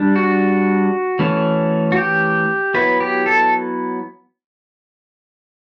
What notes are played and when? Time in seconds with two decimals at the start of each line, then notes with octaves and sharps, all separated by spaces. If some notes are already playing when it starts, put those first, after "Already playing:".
Already playing: G3 D4
0.16 F#4
1.19 E3 A3 C#4
1.92 F#4
1.97 G4
2.74 F#3 B3 E4 B4
3.00 G4
3.26 A4